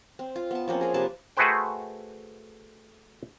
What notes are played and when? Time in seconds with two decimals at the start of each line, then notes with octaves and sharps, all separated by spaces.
0.19 C4
0.36 F4
0.51 B3 A5
0.68 F3 A#3 C4 C#4
0.81 G#4 A#4
0.94 C3 A#3 B4 A5
1.37 A3 F#4 G#4 B4 C5 G5